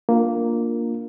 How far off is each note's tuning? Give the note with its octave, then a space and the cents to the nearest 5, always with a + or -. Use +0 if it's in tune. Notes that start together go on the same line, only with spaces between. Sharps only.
A#3 +0 D4 +0 F4 +0